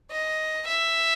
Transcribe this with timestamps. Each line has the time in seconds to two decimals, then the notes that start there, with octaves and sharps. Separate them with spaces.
0.11 D#5
0.67 E5